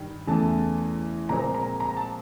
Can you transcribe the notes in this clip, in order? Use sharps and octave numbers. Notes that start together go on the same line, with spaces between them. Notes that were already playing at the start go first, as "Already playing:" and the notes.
Already playing: G2 D#3
E2 C#3 E3 A3 A5
A#2 F3 G#3 C4 A#5
A#5
A#5
A5